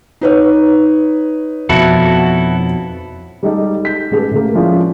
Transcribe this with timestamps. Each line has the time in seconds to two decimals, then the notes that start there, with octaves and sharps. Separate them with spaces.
0.21 D#4 B4 C#5
1.69 F2 B2 E4 F#4 A4
3.43 G3 G#3 D#4 G4 A4 D#5
3.85 G6 B6
4.11 A1 G#3 G4 A4 B4
4.31 A2 C#3 A3 A#3
4.55 F3 G#3 C#4 D4 E4 F4